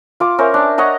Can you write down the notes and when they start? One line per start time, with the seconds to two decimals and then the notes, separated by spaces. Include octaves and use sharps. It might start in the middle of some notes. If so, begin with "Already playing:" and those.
0.20 F4 D6
0.38 C#4 A#4 C5 E5
0.54 D4
0.78 C#5 D#5 F#5 A#5